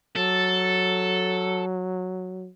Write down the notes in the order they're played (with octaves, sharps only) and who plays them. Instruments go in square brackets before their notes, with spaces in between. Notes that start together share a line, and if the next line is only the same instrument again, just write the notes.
[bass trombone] F#3 [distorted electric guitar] A4